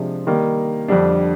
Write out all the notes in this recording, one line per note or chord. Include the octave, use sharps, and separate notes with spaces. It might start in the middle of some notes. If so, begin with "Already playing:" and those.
Already playing: C3 F3 G#3 D4
D#3 G3 A#3
F2 D3 G3 D4